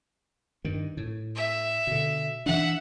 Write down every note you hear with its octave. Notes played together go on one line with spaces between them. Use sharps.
G2 D#3
A2
E5
B2 D3
E3 D4 E5 F#5